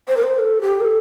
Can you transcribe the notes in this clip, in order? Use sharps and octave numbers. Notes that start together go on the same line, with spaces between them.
C5
A#4
C5
A4
G4
A#4
A4